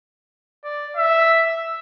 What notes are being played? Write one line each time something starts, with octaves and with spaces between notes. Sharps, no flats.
D5
E5